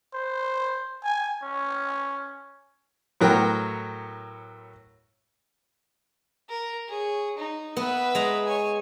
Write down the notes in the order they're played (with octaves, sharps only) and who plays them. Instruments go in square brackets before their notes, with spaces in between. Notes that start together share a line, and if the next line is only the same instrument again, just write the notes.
[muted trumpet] C5
G#5
C#4
[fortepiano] A2 F#3 B3 A#4 G5
[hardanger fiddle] A#4
G#4 C#5
D#4
[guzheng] B3 [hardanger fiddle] B4 E5
[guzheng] G#3 A#5
[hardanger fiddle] C#5 G#5